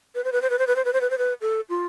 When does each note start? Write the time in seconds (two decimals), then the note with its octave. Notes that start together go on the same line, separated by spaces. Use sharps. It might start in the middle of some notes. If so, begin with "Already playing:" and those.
0.15 B4
0.24 C5
0.32 B4
0.42 C5
0.50 B4
0.59 C5
0.67 B4
0.76 C5
0.85 B4
0.93 C5
1.01 B4
1.10 C5
1.18 B4
1.41 A4
1.69 F4